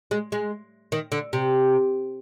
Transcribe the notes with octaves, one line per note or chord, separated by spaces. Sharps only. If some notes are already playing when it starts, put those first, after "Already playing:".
G#3
G#3
D#3
D3
C3